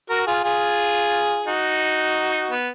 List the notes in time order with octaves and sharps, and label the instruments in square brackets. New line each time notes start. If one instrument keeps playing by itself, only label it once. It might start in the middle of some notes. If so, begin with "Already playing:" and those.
[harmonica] F#4 A#4
F4 G#4
F4 G#4
D#4 F#4
B3